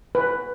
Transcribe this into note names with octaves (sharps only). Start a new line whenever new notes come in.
B4